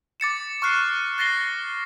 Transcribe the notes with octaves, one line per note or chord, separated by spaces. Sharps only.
D6 A6 C#7 E7
C#6 F6 F#6 C7
F#6 A6 A#6 C7 G7